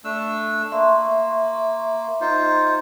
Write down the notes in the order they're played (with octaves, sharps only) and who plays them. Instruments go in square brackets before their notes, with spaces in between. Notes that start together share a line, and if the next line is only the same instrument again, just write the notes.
[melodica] A3 D4 E6
[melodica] A#3 [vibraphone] E5 C6 C#6
[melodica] D#4 F4 C5